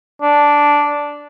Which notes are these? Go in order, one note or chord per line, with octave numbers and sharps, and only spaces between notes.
D4